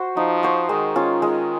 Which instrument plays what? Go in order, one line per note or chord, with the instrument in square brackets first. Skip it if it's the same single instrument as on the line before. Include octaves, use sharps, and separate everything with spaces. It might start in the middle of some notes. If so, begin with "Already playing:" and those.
Already playing: [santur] F#4 C5
[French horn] F3 [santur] D#4
[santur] F#4 C5
[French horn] D#3 [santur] G#3
[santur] C#4 F4
G#3